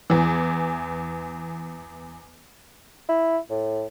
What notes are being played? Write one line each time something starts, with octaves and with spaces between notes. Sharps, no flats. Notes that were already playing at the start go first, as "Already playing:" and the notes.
E2 E3
E4
A2